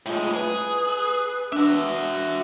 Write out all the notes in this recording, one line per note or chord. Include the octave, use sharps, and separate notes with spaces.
A2 G#3 F4
G#4 B4
D4 F#4 E5